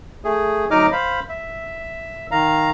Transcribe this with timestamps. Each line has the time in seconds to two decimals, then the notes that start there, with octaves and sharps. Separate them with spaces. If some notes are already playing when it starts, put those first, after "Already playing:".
0.25 A3 G#4
0.71 D2 F#3 D#4 D#5 D6 F6
0.92 C5 F5 B5
1.29 E5
2.31 D#3 F5 A#5